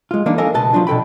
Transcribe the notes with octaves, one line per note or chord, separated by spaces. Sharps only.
G#3 F4
E3 A#3 D4 D#4
A4 A#4 D#5 F5 G#5
C#2 B2 B4 D#5 A5
F3 F#3 D4 F4
B2 D3 A4 G5 B5